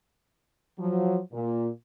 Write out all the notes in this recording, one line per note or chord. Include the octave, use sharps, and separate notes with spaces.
F3 F#3
A#2